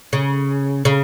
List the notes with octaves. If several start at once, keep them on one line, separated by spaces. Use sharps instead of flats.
C#3
C#3